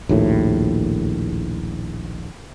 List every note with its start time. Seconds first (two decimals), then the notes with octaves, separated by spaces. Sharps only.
0.09 A#1 D#2 A2